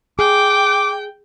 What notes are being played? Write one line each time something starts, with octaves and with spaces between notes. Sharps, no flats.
G#4 G5 D6